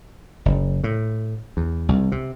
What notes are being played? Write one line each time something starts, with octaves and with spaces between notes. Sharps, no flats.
F#1
A2
E2
C2
C3